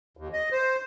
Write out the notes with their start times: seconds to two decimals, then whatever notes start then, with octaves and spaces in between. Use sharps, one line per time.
0.17 D#2
0.33 D#5
0.52 C5